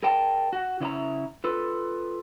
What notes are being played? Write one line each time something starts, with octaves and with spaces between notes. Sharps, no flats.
G#4 A#4 D5 G5 A5
F#4
C#3 E4 D5 E5 A#5
F4 A4 B4